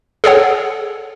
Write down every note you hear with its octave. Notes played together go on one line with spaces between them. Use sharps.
G#4 A4 C#5 F#5